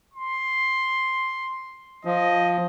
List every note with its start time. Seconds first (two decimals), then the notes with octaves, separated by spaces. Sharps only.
0.14 C6
2.05 F3 D#5